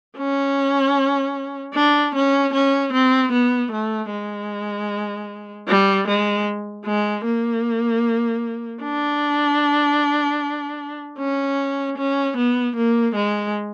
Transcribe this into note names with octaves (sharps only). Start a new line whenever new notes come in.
C#4
D4
C#4
C#4
C4
B3
A3
G#3
G3
G#3
G#3
A#3
D4
C#4
C#4
B3
A#3
G#3